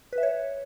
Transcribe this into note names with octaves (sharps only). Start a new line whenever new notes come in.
B4
E5
C#5